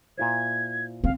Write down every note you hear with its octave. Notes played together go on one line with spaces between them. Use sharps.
A#2 E4 C5 G#6
C4 F5